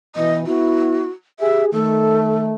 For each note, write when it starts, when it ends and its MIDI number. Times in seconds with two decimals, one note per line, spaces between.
0.16 0.46 47
0.16 0.46 52
0.16 0.35 75
0.47 1.06 59
0.47 1.06 64
0.47 1.10 66
1.40 1.71 67
1.40 1.71 68
1.40 1.65 76
1.72 2.56 51
1.72 2.56 57
1.72 2.42 69